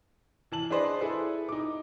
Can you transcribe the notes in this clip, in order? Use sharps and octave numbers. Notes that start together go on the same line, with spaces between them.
E3 A5 F#7
D4 G#4 B4 C5 D5 D#5
E4 G#4 A4 B4
D#4 D6